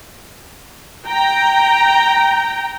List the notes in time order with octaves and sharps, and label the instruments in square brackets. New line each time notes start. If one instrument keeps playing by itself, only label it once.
[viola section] G5 A#5